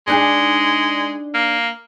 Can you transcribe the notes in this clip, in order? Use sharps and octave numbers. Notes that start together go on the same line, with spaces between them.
G#3 D4 D#4 G#4
A#3